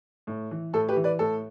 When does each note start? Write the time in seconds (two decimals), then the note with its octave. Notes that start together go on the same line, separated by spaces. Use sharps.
0.27 A2
0.51 E3
0.73 A2 A4
0.88 G4 B4
0.96 E3
1.04 B4 D5
1.19 A2 A4